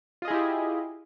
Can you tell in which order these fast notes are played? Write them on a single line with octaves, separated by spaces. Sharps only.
F4 D#5 G#4 E4 G4